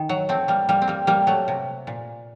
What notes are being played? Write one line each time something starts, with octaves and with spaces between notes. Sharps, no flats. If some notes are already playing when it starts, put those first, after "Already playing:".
Already playing: D#3
F#3
A3 C4
G3 A#3
G3 A#3
C4
G3 A#3
G3 A#3
F#3 A3
C3
A#2